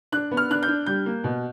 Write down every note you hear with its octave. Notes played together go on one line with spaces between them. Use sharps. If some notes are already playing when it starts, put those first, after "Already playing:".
D4 F#6
B3
F6
D4 F#6
G6
D4
G3 G6
A#3
B2